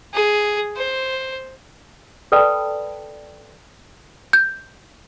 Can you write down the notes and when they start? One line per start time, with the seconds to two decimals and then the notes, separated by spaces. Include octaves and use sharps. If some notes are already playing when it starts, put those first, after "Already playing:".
0.14 G#4
0.77 C5
2.32 A4 B4 D5 G5 A5 B5
4.33 G6